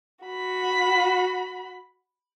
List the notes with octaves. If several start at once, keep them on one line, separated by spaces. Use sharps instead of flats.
F#4 B5